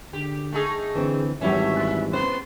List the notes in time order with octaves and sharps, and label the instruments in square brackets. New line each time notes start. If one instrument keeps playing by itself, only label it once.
[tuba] D3 [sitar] G4
[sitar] A3 D#4 G#4
[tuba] D3 [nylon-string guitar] E3 C4
[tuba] G#1 [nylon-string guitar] E3 G3 [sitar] F#3 A3 C#4 [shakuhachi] E5
[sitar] A#2
[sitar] C3 [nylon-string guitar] B3 C5 [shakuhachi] C6